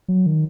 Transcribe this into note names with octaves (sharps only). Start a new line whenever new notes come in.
F#3
D#3